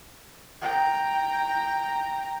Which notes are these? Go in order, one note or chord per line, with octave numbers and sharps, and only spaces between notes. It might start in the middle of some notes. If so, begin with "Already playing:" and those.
G5 A#5